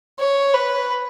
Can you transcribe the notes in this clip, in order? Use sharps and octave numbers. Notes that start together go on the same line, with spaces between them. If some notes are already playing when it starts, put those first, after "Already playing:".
C#5
B4